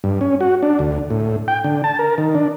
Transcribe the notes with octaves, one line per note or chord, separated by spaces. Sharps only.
G2
C#4
F#4
D4
D2
A2
G5
D3
A5
A#4
D#3
D4